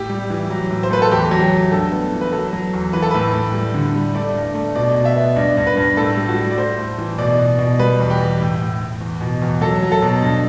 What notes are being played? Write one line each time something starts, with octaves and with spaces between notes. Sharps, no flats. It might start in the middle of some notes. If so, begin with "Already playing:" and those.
Already playing: A2 G4
G3
E3
F#3
A2
C5
A3 B4
A4
E2 G4
F#3
G4
A3
G2 A4
B3
E3
B4
F#3 A4
F#3
E2
E3 B4
A4
A2 B4
A2
G3
D3
G3
A3 D5
G2
D5
A3
B2 D5
B2
E5
B3
G2 D5
G2
B4
G2
A2 A4
G3
F#4
G3
D5
A3 C5
A2
E3
B2 D5
B2
B2
G3 B4
E2
G4
E2
A2
A2
A2
E2
B2
E2
F#3 A4
F#3
A4
B2
G2